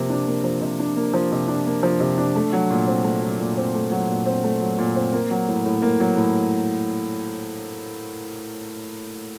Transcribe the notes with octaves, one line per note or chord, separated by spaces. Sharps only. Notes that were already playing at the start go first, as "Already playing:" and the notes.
Already playing: C3 F3 A#3
D4
A#3
F3
C3
D4
A#3
F3
C3
D4
A#3
F3
C3
D4
A3
F#3
A#2
C4
A3
F#3
A#2
C4
A3
F#3
A#2
C4
A3
F#3
A#2
C4
A#3
F#3
A2
A2
A#3
F#3
A2